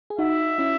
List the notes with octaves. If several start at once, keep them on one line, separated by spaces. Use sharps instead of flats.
G#4
D#4 F#4 E5
C#4 E4